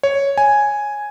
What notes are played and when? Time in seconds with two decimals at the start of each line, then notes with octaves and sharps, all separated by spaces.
0.03 C#5
0.38 G#5